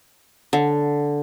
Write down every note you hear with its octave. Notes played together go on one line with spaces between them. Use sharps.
D3